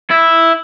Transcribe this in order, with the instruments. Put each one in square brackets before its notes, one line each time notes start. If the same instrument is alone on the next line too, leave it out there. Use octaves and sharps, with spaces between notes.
[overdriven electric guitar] E4